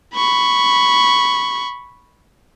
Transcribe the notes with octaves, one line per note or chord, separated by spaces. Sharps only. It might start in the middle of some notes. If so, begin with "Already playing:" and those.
B5 C#6